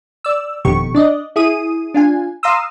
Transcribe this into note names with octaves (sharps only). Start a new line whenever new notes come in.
D5 E6
G1 F2 B2 D#3 G4 C#6
D4 D5 D#5
E4 G#4 D#6 D#7
D4 F4 G#5
F5 A#5 C6 D#6 E6